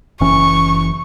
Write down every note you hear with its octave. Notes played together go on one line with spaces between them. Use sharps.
F#1 E3 C#4 C#6